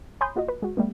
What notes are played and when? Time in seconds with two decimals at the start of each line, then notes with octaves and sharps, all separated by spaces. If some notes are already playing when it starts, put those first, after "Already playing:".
0.21 C#5 G#5 B5 C6 D#6 G6
0.36 A#3 F4 F#4 D#5
0.48 B4
0.62 G#3 F#4
0.77 G3 A3 B3